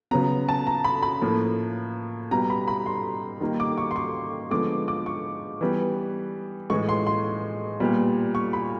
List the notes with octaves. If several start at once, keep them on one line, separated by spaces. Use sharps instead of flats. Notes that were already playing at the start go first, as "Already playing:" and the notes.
C#3 F#3 B3 A#5
A5
A#5
B5
B5
A2 F3 A#3
B2 G3 B3 A#5
B5
B5
C6
D#3 G3 A#3
D6
C#6
C6
C#6
D3 F3 G#3 B3 D6
D6
C#6
E3 G3 B3
A2 E3 G#3 C#6
C6
C6
A#2 G3 B3
C#6
B5